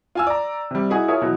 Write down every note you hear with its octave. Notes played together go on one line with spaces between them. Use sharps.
F4 G#5 E6
D5 A#5
C3 G3
D#4 E4 F#4 G#4
F4 G#4 A#4 C#5 E5
B2 E3 F#3